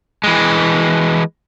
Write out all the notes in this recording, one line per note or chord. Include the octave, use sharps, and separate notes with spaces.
E3 G#3